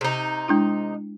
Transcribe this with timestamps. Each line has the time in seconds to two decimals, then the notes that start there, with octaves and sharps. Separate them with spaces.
0.01 C3 D#4
0.48 G#3 D4 E4